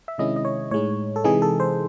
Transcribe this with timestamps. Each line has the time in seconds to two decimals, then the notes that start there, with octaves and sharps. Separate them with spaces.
0.08 E5
0.18 C3 D#3 G#3 C#4 E4 D#5
0.36 D#5
0.45 C#5
0.71 A2 G#3 D#4 C#5
1.16 A4
1.24 C3 E3 G#3 D#4 G#4
1.42 A4
1.60 C5